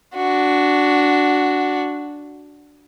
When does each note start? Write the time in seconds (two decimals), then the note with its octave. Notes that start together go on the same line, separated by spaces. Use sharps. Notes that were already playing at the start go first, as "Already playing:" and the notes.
0.15 D4 F#4